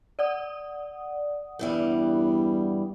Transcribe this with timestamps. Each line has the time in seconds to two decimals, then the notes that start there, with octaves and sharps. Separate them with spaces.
0.19 D5 F#5 D#6
1.59 E2 G2 E3 G3